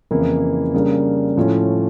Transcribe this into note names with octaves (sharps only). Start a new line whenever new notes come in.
F2 C#3 E3 A#3 E4
C#3 G3 A#3 D4
A2 F3 A3 C#4